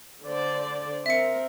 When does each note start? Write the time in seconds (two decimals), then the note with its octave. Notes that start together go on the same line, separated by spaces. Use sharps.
0.25 D3 C5 D5
1.06 C4 A#4 E5 C#7